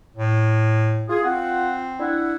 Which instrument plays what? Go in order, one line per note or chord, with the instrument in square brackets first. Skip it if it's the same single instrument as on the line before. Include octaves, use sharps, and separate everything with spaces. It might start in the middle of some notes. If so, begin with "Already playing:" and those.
[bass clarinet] A2
[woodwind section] F4 G#4
[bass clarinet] C4 [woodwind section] F4 F#5
[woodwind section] D4 E4 F#5